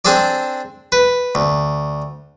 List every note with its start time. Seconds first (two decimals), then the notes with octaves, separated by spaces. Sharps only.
0.05 C4 D4 G#4 A4 D5
0.92 B4
1.35 D2